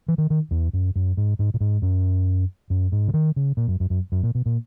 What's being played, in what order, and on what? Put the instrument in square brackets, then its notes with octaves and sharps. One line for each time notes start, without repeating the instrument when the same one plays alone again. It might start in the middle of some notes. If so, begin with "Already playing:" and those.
[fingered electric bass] E3
D#3
D#3
E2
F#2
F#2
G#2
G#2
A#2
G#2
F#2
F#2
G#2
C#3
D#3
C#3
A#2
F#2
F#2
F#2
F#2
A#2
B2
A#2